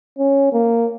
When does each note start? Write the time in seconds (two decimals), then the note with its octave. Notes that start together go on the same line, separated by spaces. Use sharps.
0.19 C#4
0.53 A#3